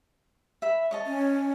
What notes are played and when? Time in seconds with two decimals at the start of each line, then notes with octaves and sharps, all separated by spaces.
0.62 E5 B5
0.91 C#5 D#5 A5
1.06 C#4